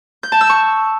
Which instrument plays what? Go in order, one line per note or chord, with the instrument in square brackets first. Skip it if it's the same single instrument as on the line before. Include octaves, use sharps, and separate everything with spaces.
[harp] G6
A5
E6
C#6